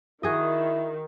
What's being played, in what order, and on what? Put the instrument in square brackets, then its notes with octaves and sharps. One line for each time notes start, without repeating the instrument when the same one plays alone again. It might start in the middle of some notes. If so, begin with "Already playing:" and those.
[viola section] D#3 [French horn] E4 [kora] F#4 G#4 D#5